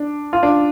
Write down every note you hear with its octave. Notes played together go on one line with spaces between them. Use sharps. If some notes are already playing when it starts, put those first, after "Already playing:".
Already playing: D4
F4
D4